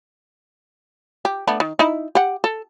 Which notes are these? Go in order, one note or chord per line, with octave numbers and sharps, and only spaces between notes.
G4
A3 B3 D4
D#3
D#4 E4
G4 F#5
A4